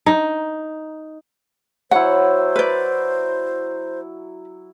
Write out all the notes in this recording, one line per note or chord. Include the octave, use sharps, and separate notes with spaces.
D#4
F#3 E4 C5 F#5
B4 D5